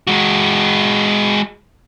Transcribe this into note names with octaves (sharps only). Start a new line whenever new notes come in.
G#3 F#4